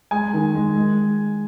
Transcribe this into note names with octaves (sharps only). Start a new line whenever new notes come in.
G#3 G#5
D#3
G#3
G#3